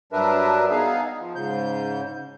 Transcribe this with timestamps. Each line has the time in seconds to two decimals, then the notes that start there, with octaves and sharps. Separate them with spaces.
0.12 G2 F#3 D4 A#4 B4 E5
0.70 B3 D#4 G#4 F5
1.20 F3
1.35 G#2 C#3 G6